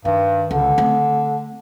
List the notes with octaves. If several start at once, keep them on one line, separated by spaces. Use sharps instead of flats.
G2 D#3
C#2 D3
A3 C4